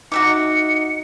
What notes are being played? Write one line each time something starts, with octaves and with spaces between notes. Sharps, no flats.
D#4 F#4 E5 D6 C#7